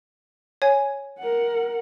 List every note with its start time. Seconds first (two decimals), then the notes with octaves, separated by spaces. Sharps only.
0.62 C#5 G#5
1.19 A#4 F#5